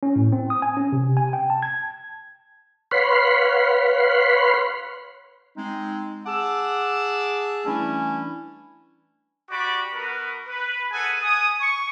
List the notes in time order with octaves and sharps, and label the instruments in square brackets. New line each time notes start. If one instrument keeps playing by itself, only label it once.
[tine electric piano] C#4
A2
C4
D#6
G#5
C#4
C3
G#5
G5
A5
G#6
[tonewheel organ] B4 C#5 F5 F#5 B5 C6
[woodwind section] G#3 C4 D#4
G#4 F#5 A5 D6 E6
E3 G3 A3 C#4 D4 E4
[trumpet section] F#4 G4 D5 B5 D6
B3 F#4 A#4 B4
B4
G#4 A4 B4 F#5 G#5
G#5 D#6
C#6